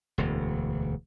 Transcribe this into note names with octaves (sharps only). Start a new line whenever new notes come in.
E1 D2